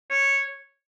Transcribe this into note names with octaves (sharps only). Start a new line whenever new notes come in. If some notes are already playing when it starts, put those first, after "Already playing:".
C#5